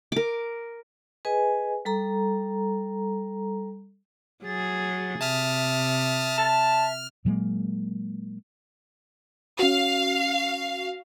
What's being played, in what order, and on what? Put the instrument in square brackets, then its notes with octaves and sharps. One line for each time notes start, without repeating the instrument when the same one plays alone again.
[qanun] A#4 D6
[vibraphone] G#4 B4 D#5 G#5
G3 A4 A#5
[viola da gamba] F#3 G#4 [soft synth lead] A6
[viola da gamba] C3 [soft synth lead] E5 [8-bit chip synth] A5 D#6 F6
[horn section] A5 [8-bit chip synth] F6
[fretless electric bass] A#2 F#3 G#3 A#3
[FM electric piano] C#4 F#4 [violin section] F5